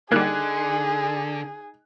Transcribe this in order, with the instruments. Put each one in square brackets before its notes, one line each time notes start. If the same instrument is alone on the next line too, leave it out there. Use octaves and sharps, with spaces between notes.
[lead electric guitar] D3 [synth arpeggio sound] G3 A#3 [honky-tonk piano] D#4 F#6 G#6 [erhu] G#4